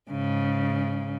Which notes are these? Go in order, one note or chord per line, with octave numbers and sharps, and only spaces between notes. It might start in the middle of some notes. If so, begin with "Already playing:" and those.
G#2 C#3